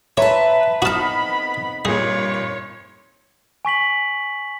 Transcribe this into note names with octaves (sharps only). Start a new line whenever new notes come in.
B4 C#5 E5 A5 A#5 C6
F2 B3 D#4 F#4 A5 B5 D#6 F6
G2 A#2 G#4 C#5
G#5 C#6 B6 F#7